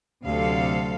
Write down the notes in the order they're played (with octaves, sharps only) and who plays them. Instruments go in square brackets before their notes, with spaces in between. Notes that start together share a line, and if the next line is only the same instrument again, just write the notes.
[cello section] D2 C3 F#3 A4 F5